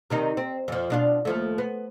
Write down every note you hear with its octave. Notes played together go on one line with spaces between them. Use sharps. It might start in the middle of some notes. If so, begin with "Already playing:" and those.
C3 D#3 D#4
C4
F2 F3
B2 D4 F4
D#2 F3 A3
B3